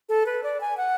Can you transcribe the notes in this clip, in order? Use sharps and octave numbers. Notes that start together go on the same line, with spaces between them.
A4
B4
D5
G#5
F#5